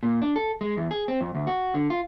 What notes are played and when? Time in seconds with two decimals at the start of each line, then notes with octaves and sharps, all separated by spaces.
0.03 A#2
0.22 D4
0.36 A4
0.61 G#3
0.77 E2
0.91 G#4
1.08 C4
1.21 F2
1.34 D2
1.47 F#4
1.74 D3
1.90 F4